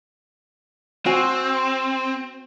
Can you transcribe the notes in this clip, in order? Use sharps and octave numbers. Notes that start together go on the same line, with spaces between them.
C4 F#4 G#5